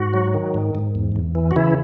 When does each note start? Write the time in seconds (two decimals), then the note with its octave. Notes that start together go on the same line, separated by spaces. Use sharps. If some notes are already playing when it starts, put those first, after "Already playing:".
Already playing: G#2 F#4
0.14 F#3
0.34 D#3
0.54 G#2
0.75 G#2
0.95 E2
1.16 E2
1.35 E3
1.51 F#4
1.56 C#3 E3 E4